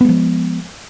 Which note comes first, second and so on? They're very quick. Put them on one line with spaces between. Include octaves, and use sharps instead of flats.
B3 G#3 F3